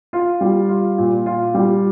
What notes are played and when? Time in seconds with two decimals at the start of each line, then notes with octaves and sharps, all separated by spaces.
0.13 F4
0.41 G3
0.69 F4
0.98 A#2
1.26 F4
1.54 G3